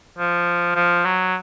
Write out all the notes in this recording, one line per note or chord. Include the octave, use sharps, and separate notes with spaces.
F3
F3
F#3